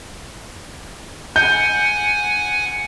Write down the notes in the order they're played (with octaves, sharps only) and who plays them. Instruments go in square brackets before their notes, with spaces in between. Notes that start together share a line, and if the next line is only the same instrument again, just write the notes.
[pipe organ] F#5 G#5 [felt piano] G6